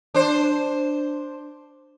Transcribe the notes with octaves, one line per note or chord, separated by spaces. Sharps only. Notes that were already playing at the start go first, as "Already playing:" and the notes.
D4 C5